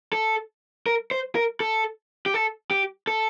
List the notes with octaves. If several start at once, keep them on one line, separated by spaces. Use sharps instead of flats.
A4
A#4
C5
A#4
A4
G4
A4
G4
A4